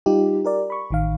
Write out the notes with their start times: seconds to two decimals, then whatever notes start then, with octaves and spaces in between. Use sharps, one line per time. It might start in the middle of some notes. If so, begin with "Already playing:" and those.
0.06 G3 D#4 F4 G4
0.45 G4 A#4 D5
0.70 B5 C#6
0.91 A1 D#3 F5